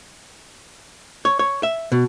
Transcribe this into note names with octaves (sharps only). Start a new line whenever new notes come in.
C#5
C#5
E5
B2